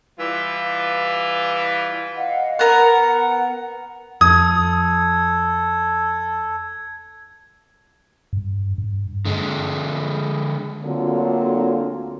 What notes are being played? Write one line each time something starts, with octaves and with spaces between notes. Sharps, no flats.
E3 G3 F4 B4
D#5 F5 F#5
B3 A#4 F#5 A#5
F2 A4 D#6 G#6
G2
G2
D3 G#3
D2 D3 F#3 A#3 C4 F4